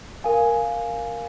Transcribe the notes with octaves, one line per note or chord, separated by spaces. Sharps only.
A#4 F5 G#5